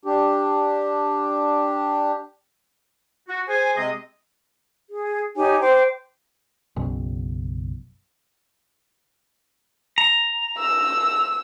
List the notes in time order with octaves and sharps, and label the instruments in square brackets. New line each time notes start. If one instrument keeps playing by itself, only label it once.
[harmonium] D4 G4
[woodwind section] F#4
G#4 C5 G#5
C3 G#3 C4 G#4 D#5
[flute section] G#4
D#4 G4 C#5 G#5
C5 G5 D6
[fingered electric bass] F#1 B1
[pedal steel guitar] A#5
[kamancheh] E6